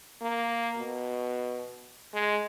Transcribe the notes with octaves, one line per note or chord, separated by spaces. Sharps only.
A#3
B2
G#3